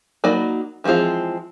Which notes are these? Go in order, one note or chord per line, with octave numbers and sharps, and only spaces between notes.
F#3 A#3 D#4 D5 B5
E3 F3 G#3 C4 F4